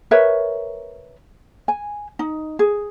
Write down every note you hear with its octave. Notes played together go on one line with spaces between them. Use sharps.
A#4 B4 C#5 E5
G#5
D#4
G#4